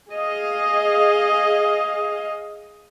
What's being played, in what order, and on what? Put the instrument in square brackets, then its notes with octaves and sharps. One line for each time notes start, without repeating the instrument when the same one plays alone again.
[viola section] G#4 D#5 F5